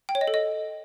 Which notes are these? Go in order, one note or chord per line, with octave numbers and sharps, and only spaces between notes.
G5
C#5
D#5
A4
D#5